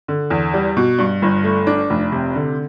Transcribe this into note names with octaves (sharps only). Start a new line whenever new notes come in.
D3
E2
G3
B2
G2
G1
A3
D4
F1
C3
D3